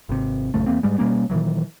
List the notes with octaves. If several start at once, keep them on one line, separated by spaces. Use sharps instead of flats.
G#1 C3
A#1 F#2 C#3 A3
E2 A#2 A#3 C4
G#2 G3 G#3
B2 G3 A#3 C#4
A#2 D#3 E3 F#3